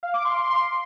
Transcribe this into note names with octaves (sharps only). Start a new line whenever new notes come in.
F5
D6
C6